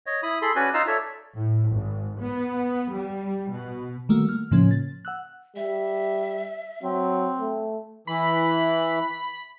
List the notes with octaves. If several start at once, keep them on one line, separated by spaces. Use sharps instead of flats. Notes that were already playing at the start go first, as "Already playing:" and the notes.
C#5 D#5
E4 B5 D#6
G#4 A4 B5 C6
C#4 F#4 B4 D5 G#5
D#4 F4 D#5 F5 A#5 E6
A4 C#5 D5 E5
A2
G#1
B3
G3
B2
D#3 G3 A3 A#3 F#4
F6
A2 C#3 F3 A#3 C#4
A6
F#5 E6 F#6
G3 E5
F#3 C4
A3
E3 B5